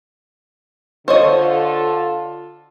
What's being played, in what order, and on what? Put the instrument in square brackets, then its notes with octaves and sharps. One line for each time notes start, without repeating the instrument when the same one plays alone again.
[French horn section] D3 F4 A4 [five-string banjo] C5 C#5 D#5